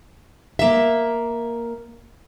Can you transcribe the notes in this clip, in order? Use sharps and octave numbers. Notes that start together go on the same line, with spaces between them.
A#3 E5